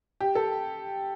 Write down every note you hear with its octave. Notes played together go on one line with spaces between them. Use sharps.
G4
A4